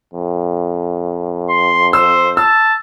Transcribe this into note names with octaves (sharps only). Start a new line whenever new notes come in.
F2
C6
C5 E6
A5 E6